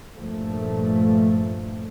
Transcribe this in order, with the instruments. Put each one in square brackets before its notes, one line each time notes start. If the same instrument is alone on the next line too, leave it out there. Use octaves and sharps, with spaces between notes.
[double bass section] G2 A#2 F3 A3